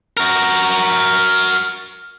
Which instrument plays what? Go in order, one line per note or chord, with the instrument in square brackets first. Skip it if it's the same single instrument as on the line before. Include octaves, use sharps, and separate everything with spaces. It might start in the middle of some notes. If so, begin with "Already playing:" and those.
[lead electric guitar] F#4 A#4